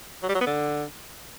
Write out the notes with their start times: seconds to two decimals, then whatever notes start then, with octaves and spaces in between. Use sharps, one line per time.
0.23 F#3
0.29 G3
0.35 F#3
0.41 B3
0.47 D3